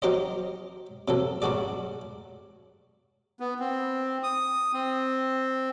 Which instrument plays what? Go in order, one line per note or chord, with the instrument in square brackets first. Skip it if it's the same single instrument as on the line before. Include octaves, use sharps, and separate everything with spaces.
[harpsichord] F#3 D#4 G4 C5 D#5
C3 F#3 A4
G2 F#3 F#4 G#4 D5
[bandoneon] B3
C4
D#6
C4